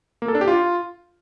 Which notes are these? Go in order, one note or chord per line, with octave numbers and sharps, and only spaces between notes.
A#3
A4
D4
G4
F4